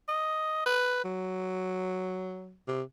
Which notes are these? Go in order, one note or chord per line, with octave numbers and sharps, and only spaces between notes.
D#5
B4
F#3
C3